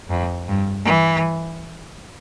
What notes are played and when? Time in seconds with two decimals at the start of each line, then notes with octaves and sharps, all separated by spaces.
0.10 F2
0.48 G2
0.85 E3